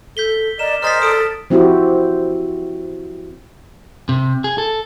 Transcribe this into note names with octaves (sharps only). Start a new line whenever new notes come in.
A4 G6 B6 G7
A#4 D5 D#5 E7
G#4 A#4 C5 D5 D#5 F6 A6 B6
A4 D#6 D7
F3 C4 E4 F#4 G4
C3
G#4
A4